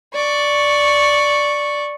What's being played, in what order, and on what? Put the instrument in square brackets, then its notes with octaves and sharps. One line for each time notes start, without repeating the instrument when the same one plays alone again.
[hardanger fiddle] D5 C#6